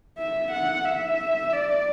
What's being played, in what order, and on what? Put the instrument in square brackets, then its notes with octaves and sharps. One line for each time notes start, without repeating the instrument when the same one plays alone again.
[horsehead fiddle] E5
F#5
E5
D5